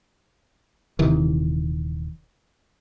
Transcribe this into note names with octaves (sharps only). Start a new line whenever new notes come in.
D#1 C3 D#3 E3